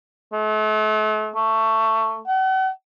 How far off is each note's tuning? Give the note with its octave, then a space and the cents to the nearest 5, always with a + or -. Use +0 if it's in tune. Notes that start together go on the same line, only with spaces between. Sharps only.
A3 -40
A3 +15
F#5 +40